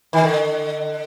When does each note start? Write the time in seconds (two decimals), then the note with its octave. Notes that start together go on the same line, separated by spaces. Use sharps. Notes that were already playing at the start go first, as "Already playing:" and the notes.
0.13 D#3
0.24 D3